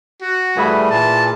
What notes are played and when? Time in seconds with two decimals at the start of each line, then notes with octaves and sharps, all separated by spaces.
0.22 F#4
0.57 E3 G3 A3 G#4 E5 B5
0.90 A#2 E3 A5